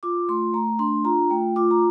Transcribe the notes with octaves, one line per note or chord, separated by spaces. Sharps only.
F4 D6
A3 C6
A3 A#5
D4 C6
F4 A#5
A3 G5
F4 D6
A#5